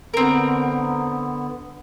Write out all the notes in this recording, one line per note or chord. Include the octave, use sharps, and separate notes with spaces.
D3 B3 C4 A#4